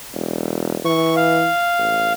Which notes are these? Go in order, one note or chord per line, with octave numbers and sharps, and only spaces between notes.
E1
E3 C#6
F5
A1